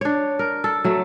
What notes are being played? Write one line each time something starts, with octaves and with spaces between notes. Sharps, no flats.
D4 C#5
A#4
A4
F#3 A3